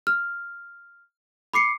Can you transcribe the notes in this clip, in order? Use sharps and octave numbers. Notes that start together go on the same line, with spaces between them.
F6
B5 D6 C7 C#7